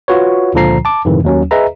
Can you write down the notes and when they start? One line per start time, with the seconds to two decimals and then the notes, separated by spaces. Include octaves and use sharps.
0.08 F4 F#4 B4 C#5
0.54 C#2 A#2 D3 F3 A#5 C7
0.85 A5 D6
1.05 F2 G#2 C3 D#3 E3
1.24 D#2 F#3 C#4
1.51 G#4 B4 D#5 E5 A#5